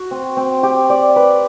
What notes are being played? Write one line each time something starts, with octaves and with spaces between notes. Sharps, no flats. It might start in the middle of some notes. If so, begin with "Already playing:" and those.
Already playing: F#4
C4
C4
G4
D5
B4